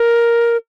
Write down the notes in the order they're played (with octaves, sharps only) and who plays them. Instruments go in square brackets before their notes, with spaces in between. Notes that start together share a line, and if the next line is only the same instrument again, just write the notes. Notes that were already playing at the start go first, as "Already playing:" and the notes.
Already playing: [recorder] A#4